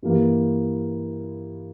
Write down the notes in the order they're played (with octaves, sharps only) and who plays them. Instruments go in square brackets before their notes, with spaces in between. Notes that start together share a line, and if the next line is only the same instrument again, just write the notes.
[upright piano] G2 E3 A#3